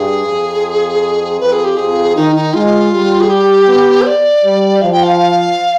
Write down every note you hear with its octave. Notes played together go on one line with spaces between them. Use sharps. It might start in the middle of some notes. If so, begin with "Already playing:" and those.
Already playing: G2 G#4
F2
F2 B4
G#4
G4
F2 G#4
D#3 D#4
D#4
G#3 F4
G3
G#4
G4
B3
C5
D5
G3
F3 F5
G5
F5